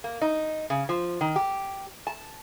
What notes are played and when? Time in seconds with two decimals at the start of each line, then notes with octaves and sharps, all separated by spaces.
0.04 A#3
0.22 D#4
0.70 C#3
0.89 F3
1.21 D#3
1.36 G4
2.07 A5